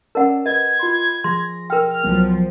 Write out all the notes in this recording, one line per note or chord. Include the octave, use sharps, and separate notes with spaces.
C#4 A#4 D5 F#5 A5
B4 D#5 G#6
F4 B5 C6
F3 G#4 C6 A#6
A#4 G5 F6
C2 F3 F#3 B3